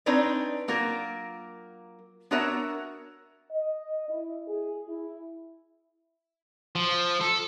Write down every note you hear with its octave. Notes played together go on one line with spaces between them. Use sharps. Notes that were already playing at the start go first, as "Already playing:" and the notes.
C4 D4 D#4 B4 C#5 D5
F#3 A#3 F4 A#4
B3 D4 F#4 A#4 C#5 E5
D#5
E4
G#4
E4
F3
A4